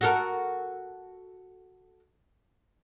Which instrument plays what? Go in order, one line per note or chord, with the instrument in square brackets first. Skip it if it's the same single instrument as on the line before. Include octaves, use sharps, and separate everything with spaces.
[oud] F#4 A4 A#4